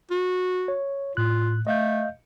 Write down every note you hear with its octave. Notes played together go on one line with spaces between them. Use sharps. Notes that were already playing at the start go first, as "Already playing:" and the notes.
F#4
C#5
A2 F4 F#6
A3 D#5 F5 G6